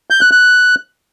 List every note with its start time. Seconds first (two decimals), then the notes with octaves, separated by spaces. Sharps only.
0.10 G6
0.21 F#6
0.32 F#6